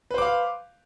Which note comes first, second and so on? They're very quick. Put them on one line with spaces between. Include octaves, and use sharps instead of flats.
B4 C5 D6 F5